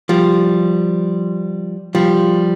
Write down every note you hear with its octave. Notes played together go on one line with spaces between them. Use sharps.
F3 G3
F3 G3